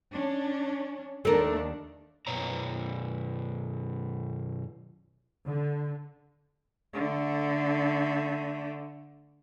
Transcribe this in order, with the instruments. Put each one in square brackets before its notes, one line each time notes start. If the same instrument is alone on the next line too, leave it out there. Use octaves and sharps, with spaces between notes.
[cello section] C#4 D4
[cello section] D#2 D4 [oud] A3 A#4
[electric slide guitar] F#2 B2 C#5 A#5
[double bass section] D3
[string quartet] D3 A3